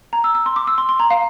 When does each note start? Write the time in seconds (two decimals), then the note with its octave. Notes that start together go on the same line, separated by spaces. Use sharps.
0.13 A#5
0.24 E6
0.35 E6
0.46 C6
0.56 D6
0.67 E6
0.78 C6
0.89 C6
1.00 A#5
1.10 F5